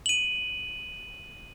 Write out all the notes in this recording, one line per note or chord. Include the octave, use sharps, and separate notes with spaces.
D#7 F#7